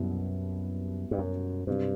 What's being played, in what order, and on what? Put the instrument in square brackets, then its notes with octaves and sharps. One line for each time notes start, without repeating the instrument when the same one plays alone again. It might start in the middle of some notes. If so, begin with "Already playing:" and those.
Already playing: [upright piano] C2 B2 G3 B3 E4 [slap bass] F#2
[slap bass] G2
F#2
[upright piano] C2 C3 F#3 C4 [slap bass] G2